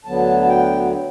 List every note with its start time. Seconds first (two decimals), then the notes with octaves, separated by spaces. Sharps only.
0.05 D2 D3 F#3 B3 A5
0.41 A5
0.49 G5